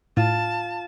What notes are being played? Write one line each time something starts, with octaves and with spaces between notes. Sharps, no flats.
A2 F4 A5